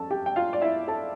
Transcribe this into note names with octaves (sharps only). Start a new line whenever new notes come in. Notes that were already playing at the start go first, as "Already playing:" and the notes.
Already playing: F2 C#4 A4 A5
G4 G5
G5
F4 F5
D5
E4 E5
A4 A5